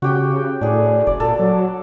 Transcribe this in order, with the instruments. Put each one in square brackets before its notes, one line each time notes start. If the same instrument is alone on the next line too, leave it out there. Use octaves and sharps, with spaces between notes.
[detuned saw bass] C#3 [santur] F#4 G4 G5
[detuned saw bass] A2 [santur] D4 G#4
[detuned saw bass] F#1 [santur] D5
[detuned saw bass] A#2 [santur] A4
[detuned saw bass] F#3